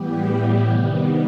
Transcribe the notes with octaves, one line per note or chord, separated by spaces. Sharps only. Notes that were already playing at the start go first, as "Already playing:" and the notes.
Already playing: A2 E3 G3 B3 G4
G4
C3 D#3 G3 B3